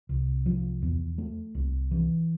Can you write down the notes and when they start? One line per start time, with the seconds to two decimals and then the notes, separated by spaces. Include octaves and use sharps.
0.09 C2
0.46 F3
0.82 E2
1.18 A3
1.55 C2
1.91 E3